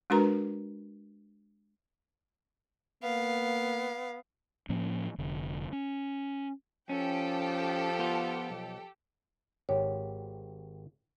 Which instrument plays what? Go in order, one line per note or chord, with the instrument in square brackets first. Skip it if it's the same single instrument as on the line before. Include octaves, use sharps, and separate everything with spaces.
[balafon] G#3 D4 F#4 A#4 B4 A#5
[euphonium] A#3 [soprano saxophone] B3 [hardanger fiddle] F5
[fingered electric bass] A2 F3 A#3 C#4
F1 D3
C#4
[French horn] F3 [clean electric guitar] C#4 [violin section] G4 A4 G5
[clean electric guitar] B3 F4
B1
[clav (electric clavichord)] G#1 G4 [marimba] C#5